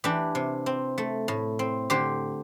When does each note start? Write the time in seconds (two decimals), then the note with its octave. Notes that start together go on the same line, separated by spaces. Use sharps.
0.04 E3 D4 G4
0.35 C3
0.66 C4
0.98 A3
1.28 A2
1.59 C4
1.90 D3 G4 C5